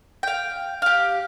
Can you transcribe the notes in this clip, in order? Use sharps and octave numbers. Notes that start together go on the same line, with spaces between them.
F5 G5
G4 F5